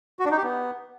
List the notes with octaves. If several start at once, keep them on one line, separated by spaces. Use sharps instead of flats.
F#4
D4
D#4
G4
B3